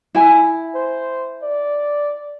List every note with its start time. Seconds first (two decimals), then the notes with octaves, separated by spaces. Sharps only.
0.15 E4 G#5
0.75 C5
1.43 D5